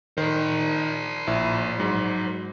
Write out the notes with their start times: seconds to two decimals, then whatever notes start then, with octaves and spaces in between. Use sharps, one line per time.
0.18 D#3 A#4 C5
1.27 A#1 E4
1.78 G#2 F#3